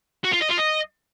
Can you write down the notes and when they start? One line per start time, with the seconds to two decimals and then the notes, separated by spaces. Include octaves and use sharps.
0.24 F#4
0.32 F4
0.41 D#5
0.49 F4
0.58 D#5